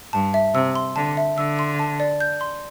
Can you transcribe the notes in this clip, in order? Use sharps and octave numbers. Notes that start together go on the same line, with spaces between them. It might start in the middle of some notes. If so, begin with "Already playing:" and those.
G2 A5
E5
C3 E6
C6
D3 A5
E5
D3 E6
C6
A5
D5
G6
C6